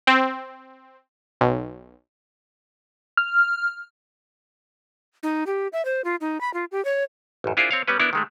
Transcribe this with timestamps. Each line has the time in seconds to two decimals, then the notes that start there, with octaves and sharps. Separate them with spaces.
0.07 C4
1.41 B1
3.17 F6
5.23 D#4
5.47 G4
5.73 E5
5.85 C5
6.05 F4
6.21 D#4
6.41 B5
6.54 F4
6.72 G4
6.85 C#5
7.44 A1 F#2
7.57 D4 E4 F4 G#4 A#4 C5
7.71 C4 C#5 F5
7.88 G3 B3 C#4 B4
7.99 B3 D4 E4 A#4
8.13 D#3 G#3 A3